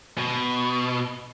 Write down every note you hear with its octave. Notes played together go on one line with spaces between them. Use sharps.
B2